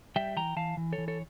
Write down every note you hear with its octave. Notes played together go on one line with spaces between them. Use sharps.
G3 E5 G5
E3 G5 A#5
E3 F5 A5
E3
A4 C#5
E3
A4 C#5